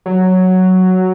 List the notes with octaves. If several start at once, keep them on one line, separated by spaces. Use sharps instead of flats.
F#3